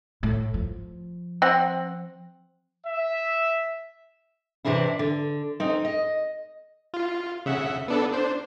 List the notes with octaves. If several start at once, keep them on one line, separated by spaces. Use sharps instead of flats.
A2
F3
C4 F#5
E5
C3 E3 C4 D4 E4
D3
C4 C#4 D#4
D#5
F4
C#3 E5 F#5
B3 D4 A4
D4 C5